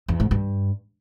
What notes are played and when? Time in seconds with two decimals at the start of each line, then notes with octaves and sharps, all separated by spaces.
0.08 E2
0.20 G#2
0.31 G2